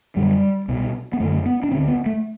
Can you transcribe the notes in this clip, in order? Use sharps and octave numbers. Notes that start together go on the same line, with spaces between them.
F#2 D3 G3
C2 B2
B3
F#2 D3 A3
B3
D4
D2 D3 C4
B3
A3